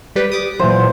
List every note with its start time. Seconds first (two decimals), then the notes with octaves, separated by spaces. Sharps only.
0.16 G3 G4 B4
0.32 D6 D#6
0.59 A#2 E3 F#3 C5